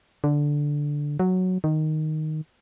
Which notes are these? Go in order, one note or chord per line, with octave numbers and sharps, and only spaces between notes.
D3
F#3
D#3